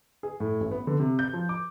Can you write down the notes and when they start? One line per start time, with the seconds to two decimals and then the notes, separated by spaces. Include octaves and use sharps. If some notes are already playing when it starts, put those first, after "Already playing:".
0.23 G#4
0.40 A2
0.60 A1
0.71 B3
0.87 D3
1.00 C3
1.19 G6
1.33 F3
1.49 D6